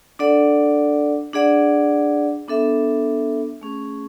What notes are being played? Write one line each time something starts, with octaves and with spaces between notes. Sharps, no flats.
D4 A4 D5 F#5
D4 G#4 D5 F#5
B3 D4 A4 E5
A3 C#4 G#4